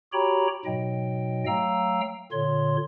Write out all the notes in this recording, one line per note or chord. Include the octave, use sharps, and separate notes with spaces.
F#4 G4 C#5 G5 A#5 B5
G#2 B2 F#3 D#5 G5
F#3 A3 F5 G5 A#5 E6
A#2 D3 F4 C#5 C6